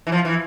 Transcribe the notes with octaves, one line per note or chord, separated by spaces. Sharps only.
E3
F3
E3